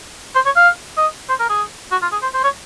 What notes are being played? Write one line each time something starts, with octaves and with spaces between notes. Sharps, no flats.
C5
C#5
F5
D#5
C5
A#4
G#4
F#4
F4
G#4
C5
C5
C#5